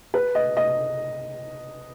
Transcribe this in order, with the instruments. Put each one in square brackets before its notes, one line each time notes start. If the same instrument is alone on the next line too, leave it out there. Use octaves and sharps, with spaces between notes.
[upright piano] B4
D#5
D#5